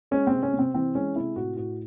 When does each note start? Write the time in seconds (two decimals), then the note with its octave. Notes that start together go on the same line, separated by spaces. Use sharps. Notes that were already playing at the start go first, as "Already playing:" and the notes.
0.11 G#3 C#4
0.27 C4
0.33 C3
0.43 C#4
0.53 C3
0.59 C4
0.74 E3 C4
0.95 G#3 C#4
1.16 C3 E4
1.36 A2 F#4
1.57 A2 F#4